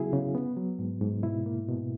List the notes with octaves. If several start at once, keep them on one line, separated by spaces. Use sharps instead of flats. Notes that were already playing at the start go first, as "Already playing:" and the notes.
Already playing: C#3 F#3 B3 E4 F#4 G#4
C#3
B3
F#3
G#2
G#2
B2 E4
A#3
B2